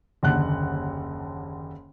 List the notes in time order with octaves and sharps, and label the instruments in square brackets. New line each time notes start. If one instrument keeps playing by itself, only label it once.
[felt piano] F#1 D#2 D3 F#5 F#6